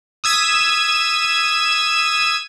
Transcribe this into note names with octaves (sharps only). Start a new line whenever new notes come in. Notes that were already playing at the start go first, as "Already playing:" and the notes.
D#6 E6 G#6 B6 D#7 E7